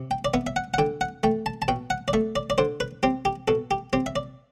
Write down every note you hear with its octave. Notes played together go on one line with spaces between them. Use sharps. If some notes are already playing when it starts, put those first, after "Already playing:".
Already playing: C3
G5
D5
B3 E5
E5
F#5
F#5
D3 G5
F#5
A3 G5
A5
A5
B2 G5
F#5
D5
A3 E5
D5
D5
D3 C5
B4
C4 G4
G4
B2 A4
G4
C4 G4
E5
D5